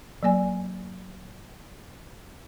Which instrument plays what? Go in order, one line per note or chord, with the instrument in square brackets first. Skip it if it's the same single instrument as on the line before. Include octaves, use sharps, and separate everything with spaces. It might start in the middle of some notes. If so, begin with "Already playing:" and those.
[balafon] F#3 A#3 D5 G#5